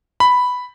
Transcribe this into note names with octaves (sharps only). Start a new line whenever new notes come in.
B5